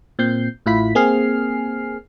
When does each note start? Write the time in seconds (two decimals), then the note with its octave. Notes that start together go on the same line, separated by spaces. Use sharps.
0.19 A#2 C4 G6 C7
0.66 A1 A2 E4 F4 B5 B6
0.95 A#3 C4 G#4 G#5 F6 C7